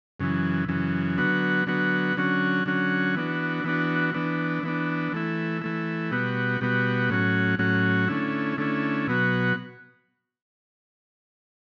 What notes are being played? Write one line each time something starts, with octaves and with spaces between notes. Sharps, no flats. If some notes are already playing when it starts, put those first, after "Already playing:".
F#2 C#3 E3
F#2 C#3 E3
D3 F#3 B3 F#4
D3 F#3 B3 F#4
D3 F#3 C#4 F#4
D3 F#3 C#4 F#4
E3 B3 D4 F#4
E3 B3 D4 F#4
E3 B3 D4
E3 B3 D4
E3 A3 E4
E3 A3 E4
B2 G3 B3 F#4
B2 G3 B3 F#4
A2 F#3 C#4 F#4
A2 F#3 C#4 F#4
D3 A3 C#4 E4
D3 A3 C#4 E4
B2 F#3 B3 F#4